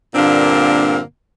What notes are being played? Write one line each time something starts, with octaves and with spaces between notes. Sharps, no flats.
G2 A#2 D3 A#3 C4 D4